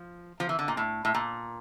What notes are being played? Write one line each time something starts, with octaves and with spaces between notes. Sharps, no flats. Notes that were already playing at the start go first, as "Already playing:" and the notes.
Already playing: F3
F3
E3
D3
A#2
A2
A2
A#2